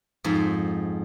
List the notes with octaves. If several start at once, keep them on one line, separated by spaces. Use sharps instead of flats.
F2 G#2